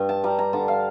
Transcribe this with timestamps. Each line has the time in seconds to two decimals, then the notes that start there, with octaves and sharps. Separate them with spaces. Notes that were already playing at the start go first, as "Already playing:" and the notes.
Already playing: G2
0.09 A5
0.24 G3 A#5
0.39 A#5
0.53 D3 A5
0.68 F5